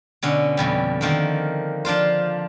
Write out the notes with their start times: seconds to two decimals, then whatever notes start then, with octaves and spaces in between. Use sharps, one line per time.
0.23 B2 D3 C#4
0.57 F2 B2 G3
1.01 D3 D#3 F3 A#3
1.85 F3 D4 F4 C5